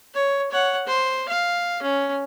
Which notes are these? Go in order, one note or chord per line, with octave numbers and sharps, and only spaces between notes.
C#5
C#5 F#5
C5
F5
C#4